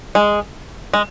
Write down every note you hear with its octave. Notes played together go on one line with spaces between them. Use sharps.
G#3
G#3